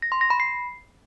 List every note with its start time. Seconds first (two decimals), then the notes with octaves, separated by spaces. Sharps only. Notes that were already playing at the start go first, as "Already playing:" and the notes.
0.02 A#6
0.12 C6
0.21 A#6
0.30 B5
0.40 C7